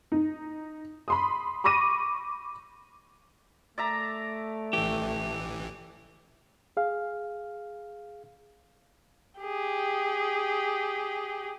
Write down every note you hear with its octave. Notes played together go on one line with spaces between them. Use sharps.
D#4
B5 C6 D#6
B5 C#6 D6 A#6 D#7
A3 D5 E5 A#5
A1 E3 G4
G#4 F5
G4 G#4